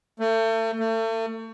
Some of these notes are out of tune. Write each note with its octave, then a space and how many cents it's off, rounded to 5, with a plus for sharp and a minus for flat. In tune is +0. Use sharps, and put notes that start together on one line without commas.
A3 +35
A3 +35